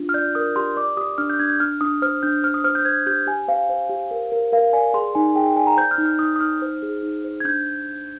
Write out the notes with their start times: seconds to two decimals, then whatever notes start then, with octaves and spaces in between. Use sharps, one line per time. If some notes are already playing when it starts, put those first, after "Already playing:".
Already playing: D4 F4
0.09 F6
0.14 D5 G6
0.35 A#4 D#6
0.56 G4 C6
0.77 D5 D6
0.97 G4 D#6
1.18 D4 F6
1.30 G6
1.40 D4 G#6
1.50 G6
1.60 D4 F6
1.81 D4 D#6
2.02 C5 F6
2.23 D4 G6
2.43 C5 F6
2.54 D#6
2.64 C5 F6
2.75 G6
2.85 C5 G#6
3.06 G4 G6
3.27 G4 G#5
3.48 C5 F5
3.69 C5
3.90 G4
4.11 A#4
4.32 A#4
4.52 A#4 F5
4.73 D5 G#5
4.94 G#4 C6
5.15 D#4 G#5
5.35 G#4 G5
5.47 G5
5.56 D5 G#5
5.67 A#5
5.77 C5 G6
5.91 F6
5.98 D#4
6.06 F6
6.19 D#4 D#6
6.36 D#6
6.41 D#4 F6
6.62 C5
6.83 G#4
7.03 D#4
7.24 C5
7.40 G#6
7.45 D4 G6